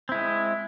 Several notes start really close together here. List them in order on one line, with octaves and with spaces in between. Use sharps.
C4 E4 G#3